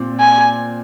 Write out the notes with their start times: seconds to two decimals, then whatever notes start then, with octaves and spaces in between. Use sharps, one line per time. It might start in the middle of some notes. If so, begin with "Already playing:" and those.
Already playing: A#2 C4
0.20 G#5